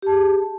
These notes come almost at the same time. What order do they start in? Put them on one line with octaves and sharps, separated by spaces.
G4 A5 G#4